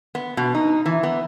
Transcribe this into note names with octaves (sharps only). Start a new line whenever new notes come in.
B3
B2
D#4
E3
B3